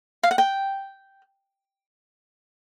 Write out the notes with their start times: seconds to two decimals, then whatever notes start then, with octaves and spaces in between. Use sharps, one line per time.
0.23 F5
0.31 F#5
0.38 G5